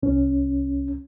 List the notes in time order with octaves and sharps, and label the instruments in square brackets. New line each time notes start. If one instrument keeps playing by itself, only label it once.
[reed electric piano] C2 C#4